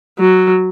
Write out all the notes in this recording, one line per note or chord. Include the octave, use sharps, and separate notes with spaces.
F#3